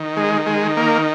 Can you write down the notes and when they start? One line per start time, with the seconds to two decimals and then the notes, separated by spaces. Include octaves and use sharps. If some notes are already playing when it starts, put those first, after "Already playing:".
Already playing: D#3
0.17 G#3
0.46 G#3
0.77 A#3